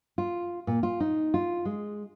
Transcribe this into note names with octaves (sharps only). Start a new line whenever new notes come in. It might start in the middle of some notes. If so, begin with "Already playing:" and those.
F4
A#2
F4
D#4
F4
G#3